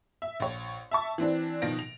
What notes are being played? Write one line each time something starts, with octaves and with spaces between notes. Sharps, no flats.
E5
A#1 C#5
E5 A5 C#6
E3 C4 D4
B2 D#3 F3 A#6 D7
F7